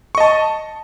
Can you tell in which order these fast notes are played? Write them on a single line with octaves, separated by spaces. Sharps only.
C#6 D#5 A5